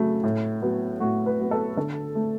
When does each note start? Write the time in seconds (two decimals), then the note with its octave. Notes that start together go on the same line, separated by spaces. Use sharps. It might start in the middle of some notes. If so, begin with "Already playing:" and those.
Already playing: C#3 F#3 A3
0.23 A2
0.62 F#3 B3
1.00 A2 F#4
1.26 B4
1.39 F#3 B3
1.51 A4
1.77 D3 A4
2.15 A3